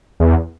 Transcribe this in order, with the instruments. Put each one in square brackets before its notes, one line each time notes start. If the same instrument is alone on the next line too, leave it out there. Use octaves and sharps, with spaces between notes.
[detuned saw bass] E2